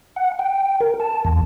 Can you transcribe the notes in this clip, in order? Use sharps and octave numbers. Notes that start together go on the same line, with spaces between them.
F#5
G5
A#4
A5
E2